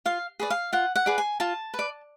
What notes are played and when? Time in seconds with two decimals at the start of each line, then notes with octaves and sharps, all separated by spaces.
0.05 F4 F5
0.39 G#4 B4 D5
0.50 F5
0.73 F4 F#5
0.96 F#5
1.06 G#4 B4 D5
1.18 G#5
1.40 F4 A5
1.74 B4
1.79 D5